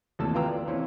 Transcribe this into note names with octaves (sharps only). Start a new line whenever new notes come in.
G#1 D#2 E3 A3 A5 E6
F4 B4 F5 G5 A#5 E6
D5
C3 E3 C4 C#4